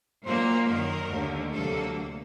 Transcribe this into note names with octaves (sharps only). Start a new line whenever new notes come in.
A#2 F#3 A#3 C5
F#2 D#3 F#3 A#4
D#2 D3 A3
D2 C3 F#3 A#3 A4